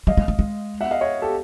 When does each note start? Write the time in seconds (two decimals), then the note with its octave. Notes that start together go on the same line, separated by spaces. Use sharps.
0.07 G3 D#5 F5
0.17 G#3
0.28 A3
0.39 G#3
0.81 E5 F#5
0.91 D#5 F5
1.01 C#5 D#5
1.22 G4 A4